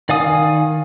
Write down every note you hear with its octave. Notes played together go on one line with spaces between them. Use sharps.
D#3 D5 F5 G#5 D#6